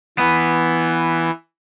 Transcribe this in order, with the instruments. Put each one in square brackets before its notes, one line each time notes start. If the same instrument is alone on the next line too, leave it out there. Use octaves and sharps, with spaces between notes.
[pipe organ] E3 [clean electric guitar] B3